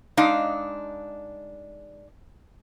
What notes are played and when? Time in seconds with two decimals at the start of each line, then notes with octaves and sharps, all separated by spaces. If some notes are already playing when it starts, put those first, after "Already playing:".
0.17 G#3 D4 D#4 F5